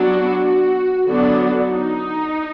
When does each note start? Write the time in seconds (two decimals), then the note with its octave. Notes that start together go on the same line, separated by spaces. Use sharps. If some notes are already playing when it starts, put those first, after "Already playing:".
Already playing: F#3 B3 D4 F#4
0.44 F#4
1.06 D3 F#3 B3 D4 F#4
1.67 D#4